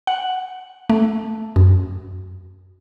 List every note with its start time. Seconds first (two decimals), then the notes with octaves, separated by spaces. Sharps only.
0.07 F#5
0.90 A3
1.56 F#2